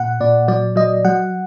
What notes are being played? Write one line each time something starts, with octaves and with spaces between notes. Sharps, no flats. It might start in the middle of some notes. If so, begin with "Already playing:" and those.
Already playing: A#2 F#5
A#2 D5
F#3 D5
F#3 D#5
F#3 F#5